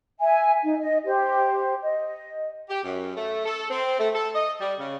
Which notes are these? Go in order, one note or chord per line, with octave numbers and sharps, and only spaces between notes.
E5 G#5
D#4
D#5
G4 C5
D#5
G4
F#2
A3
A4
C4
A3
A4
D#5
G3
C#3